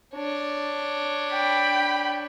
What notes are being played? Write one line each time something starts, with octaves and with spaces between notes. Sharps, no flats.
D4 C#5
G5 B5